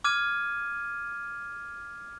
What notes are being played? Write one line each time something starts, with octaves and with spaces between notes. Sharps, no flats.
D6 F6 G#6 D#7